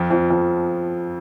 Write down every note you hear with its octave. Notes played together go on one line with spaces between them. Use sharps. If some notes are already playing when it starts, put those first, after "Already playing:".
Already playing: F2 F3
F2 F3
F2 F3